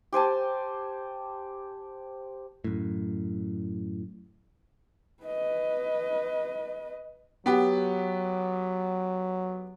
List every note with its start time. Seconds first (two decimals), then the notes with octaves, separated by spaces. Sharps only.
0.13 G4 C5 G#5 A5
2.64 F#2 A2
5.24 B4 D#5
7.46 F#3 B3 G4